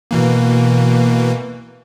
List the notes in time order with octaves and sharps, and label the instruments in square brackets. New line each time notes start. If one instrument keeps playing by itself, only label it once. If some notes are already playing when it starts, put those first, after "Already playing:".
[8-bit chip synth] B2 E3 A#3